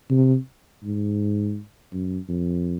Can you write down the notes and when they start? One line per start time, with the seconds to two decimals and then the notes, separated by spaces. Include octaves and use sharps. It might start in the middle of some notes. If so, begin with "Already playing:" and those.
0.10 C3
0.84 G#2
1.93 F#2
2.29 F2